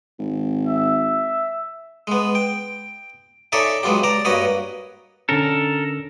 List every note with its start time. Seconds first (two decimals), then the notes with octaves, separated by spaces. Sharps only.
0.19 G#1
0.67 E5
2.07 G#3 B3
2.35 G5
3.52 D#4 A4 C#5 D5 E5 G#5
3.83 F#3 G#3 B3 F4 G4
4.03 D5 A5 A#5
4.25 G2 A#3 F#4 B4 C#5 D#5
5.29 D3 C#4 A4 A#4